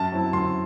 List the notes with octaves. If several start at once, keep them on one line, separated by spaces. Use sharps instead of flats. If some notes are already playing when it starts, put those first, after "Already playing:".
Already playing: F#2 A5
F#3 C4 E4
F#2 C6